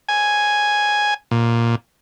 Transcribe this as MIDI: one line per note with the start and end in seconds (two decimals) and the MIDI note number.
0.09 1.14 80
1.31 1.75 46